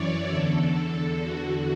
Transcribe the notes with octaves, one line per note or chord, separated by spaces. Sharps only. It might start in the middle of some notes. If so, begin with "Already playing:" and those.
Already playing: F#2 E3 C#5 D5
E2 D3 A4
E2 D3 F#4